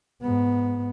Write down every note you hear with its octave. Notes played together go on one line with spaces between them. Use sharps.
G#2 B3